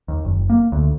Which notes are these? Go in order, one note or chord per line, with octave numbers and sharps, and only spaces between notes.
D#2
F#1
A#3
D2